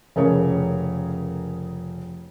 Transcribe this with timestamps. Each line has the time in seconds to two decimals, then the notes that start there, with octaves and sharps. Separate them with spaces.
0.16 F1 C#3 G#4 A#4 C#5